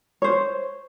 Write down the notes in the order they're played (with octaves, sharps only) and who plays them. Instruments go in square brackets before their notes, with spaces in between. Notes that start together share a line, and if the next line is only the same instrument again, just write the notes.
[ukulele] C5 C#5